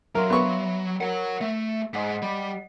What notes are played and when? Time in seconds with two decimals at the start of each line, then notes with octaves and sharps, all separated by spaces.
0.15 F#3 A#4 E5 F5 C6
0.30 B3 E5 B5 C#6
1.01 A#4 C#5 F#5
1.41 A3 E5
1.94 G#2 D#5 F#5 B6
2.22 G3